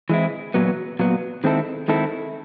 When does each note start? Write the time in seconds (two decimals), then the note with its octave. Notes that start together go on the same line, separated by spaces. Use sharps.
0.09 E3 G#3 C4 E4
0.54 A#2 F#3 B3
0.99 A#2 F#3 B3
1.44 D#3 G#3 C4 E4 A4
1.88 D#3 G#3 C4 E4 A4